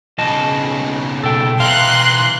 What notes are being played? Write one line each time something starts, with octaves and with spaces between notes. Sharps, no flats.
B1 C#3 D#5 A5
B2 A4 G5
B2 E3 D#4 F5 C6 F#6